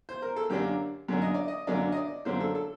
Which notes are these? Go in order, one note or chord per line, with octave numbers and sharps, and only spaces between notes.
C5
A#4
A4
F#2 D3 F#3 A#3 D4 G4
F#2 D3 F#3 A#3 D4
D#5
D5
D#5
F#2 D3 F#3 A#3 D4 D5
D#5
D5
F#2 D3 F#3 A#3 D4 C5
A4
A4